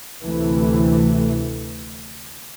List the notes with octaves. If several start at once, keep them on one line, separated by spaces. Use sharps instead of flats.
D2 C3 E3 A3